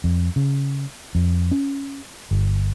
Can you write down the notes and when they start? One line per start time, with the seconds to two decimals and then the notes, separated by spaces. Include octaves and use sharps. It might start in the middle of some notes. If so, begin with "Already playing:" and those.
0.04 F2
0.36 C#3
1.15 F2
1.51 C#4
2.31 G1